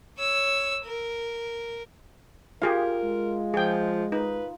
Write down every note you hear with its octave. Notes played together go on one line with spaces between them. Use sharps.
C#5 E6
A#4
F4 G4 G#4 A#4 F5
G#3
F3 G#4 G5
D#4 B4